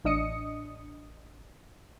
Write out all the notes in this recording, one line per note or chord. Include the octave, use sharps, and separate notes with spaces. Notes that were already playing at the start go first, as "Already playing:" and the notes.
A1 D4 D#5 D#6 C#7